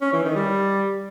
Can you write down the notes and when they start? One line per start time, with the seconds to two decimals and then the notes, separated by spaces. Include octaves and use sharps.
0.02 C#4
0.13 E3
0.24 D#3
0.36 G3